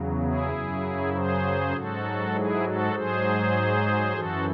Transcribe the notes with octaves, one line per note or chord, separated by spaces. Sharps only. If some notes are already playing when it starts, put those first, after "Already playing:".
Already playing: E2 C#3 F#3
E4 G#4
F#2 C#3 F#3
G#4 C5
G#2 F#3 F#4 A4
E4 G#4
F#4 A4
G#2 F#3 G#4 C5
F#2 E3 F#4 A4